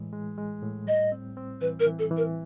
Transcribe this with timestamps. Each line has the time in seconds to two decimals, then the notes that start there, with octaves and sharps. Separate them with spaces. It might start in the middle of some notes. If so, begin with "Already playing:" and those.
Already playing: A2 E3 G#3
0.13 G#3
0.38 G#3
0.62 A2
0.87 G3 D#5
1.12 C4
1.37 C4
1.61 E3 B4
1.80 A#4
1.86 E3
1.99 A4
2.11 E3
2.17 A#4